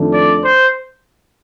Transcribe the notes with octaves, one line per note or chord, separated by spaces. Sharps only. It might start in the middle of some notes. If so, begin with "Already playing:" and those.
Already playing: F2 D#3 A3 D4
D5
C5